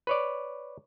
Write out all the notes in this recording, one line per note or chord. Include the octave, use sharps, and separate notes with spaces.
B4 C#5 D5